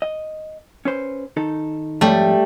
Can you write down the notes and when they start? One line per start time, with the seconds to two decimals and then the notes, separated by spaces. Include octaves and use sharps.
0.02 D#5
0.85 C#4 B4 C5
1.37 D#3 D#4 A4
2.01 F2 G#2 G3 A3